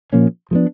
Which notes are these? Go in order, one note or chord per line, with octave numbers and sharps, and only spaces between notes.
A#2 F3 A#3 C#4
F3 G#3 B3 D4